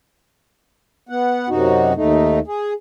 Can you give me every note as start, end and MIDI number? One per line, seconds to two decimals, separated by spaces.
1.09 1.49 59
1.09 1.49 78
1.49 1.93 42
1.49 1.93 48
1.49 1.93 63
1.49 1.93 66
1.96 2.39 39
1.96 2.39 57
1.96 2.39 63
2.47 2.73 68